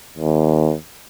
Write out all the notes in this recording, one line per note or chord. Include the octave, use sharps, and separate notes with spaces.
D#2